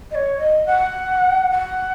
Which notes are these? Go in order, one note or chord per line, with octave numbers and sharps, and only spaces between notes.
D#5
C#5
D#5
F#5
F#5